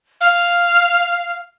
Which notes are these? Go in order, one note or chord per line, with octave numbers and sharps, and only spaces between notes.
F5